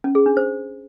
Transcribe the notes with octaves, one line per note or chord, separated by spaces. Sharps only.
C#4
G#4
D4
C5